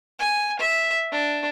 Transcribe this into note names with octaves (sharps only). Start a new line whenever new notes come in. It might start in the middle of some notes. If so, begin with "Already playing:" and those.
G#5
E5
D4